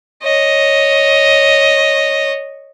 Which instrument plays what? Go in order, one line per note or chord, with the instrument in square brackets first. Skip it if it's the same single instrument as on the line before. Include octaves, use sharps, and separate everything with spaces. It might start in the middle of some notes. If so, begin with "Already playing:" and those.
[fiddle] C#5 D#5